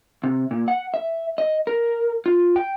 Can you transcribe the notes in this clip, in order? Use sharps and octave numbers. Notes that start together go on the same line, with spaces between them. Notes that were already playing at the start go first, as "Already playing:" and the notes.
C3
A#2
F#5
E5
D#5
A#4
F4
G5